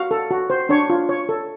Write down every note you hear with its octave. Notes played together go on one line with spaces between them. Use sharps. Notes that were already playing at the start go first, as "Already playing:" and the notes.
Already playing: F#4 F5
A4
F#4
C5
D4 C#5
F4
C#5
A4